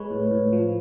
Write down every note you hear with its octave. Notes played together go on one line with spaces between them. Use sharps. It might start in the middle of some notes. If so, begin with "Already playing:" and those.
Already playing: G#3 B4 C#5
A2
A2
F3